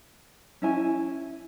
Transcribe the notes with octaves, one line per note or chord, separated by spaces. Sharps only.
C#4 E4 G#5